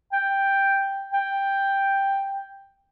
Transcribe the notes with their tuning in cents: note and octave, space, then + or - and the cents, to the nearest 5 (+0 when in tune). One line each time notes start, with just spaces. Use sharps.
G5 +5
G5 +5